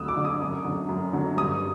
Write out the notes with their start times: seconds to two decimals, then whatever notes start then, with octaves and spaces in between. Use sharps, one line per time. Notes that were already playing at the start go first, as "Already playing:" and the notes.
Already playing: D2 D3 F#3 D#6 E6 F#6
0.08 D6
0.17 D3 F#3
0.25 D#6
0.41 F#2
0.65 D3 F#3
0.89 F#2
1.13 D3 F#3
1.37 G2 D#6